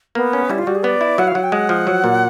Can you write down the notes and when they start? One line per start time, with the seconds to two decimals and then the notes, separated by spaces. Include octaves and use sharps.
0.15 A#3 B3
0.33 C#4
0.49 G3 E4
0.58 F4
0.67 G3 F#4
0.75 G#4
0.84 B3 D5
1.01 E4
1.18 F#3 F#5
1.27 F5
1.35 F#3 F#5
1.43 G5
1.52 G#3 F#5
1.69 F3
1.87 F#3
2.04 A#2